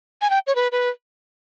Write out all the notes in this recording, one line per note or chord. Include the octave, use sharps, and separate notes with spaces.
G#5
G5
C#5
B4
B4